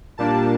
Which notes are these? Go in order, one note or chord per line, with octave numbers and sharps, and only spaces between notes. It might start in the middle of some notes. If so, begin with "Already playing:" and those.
A#2 G3 A#3 D4 A5